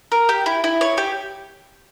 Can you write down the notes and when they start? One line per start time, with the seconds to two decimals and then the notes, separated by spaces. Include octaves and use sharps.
0.12 A#4
0.29 G4
0.46 E4
0.64 E4
0.81 C#5
0.98 G4